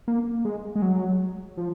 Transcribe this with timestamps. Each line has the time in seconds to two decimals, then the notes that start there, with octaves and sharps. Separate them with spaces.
0.08 A#3
0.45 G#3
0.75 G#3
0.82 F#3
1.57 F3